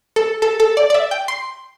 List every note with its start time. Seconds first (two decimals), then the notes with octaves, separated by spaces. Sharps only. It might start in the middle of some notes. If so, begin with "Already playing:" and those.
0.16 A4
0.42 A4
0.60 A4
0.77 D5
0.90 D5
0.94 E5
1.11 G5
1.28 C6